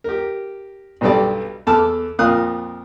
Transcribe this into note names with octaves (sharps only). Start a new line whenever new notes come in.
G4 A#4
B1 G2 G3 B3 A4 D5
E2 A4 A5 D6 E6 F6
F2 A#2 A#4 F5 D#6 F#6